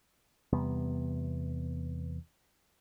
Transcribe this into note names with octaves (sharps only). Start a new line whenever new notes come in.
E2 C3 G3 B3